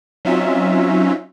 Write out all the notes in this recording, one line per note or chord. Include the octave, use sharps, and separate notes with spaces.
F#3 C4 C#4 D#4 F4 E5